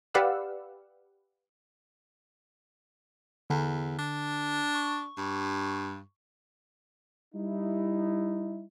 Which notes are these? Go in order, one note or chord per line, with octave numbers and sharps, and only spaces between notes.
G4 B4 D5 F5 F#5 E6
E2 D3
D4
C#6
G2
G3 D#4 E4